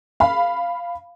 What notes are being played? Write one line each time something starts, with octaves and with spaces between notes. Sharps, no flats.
F5 B5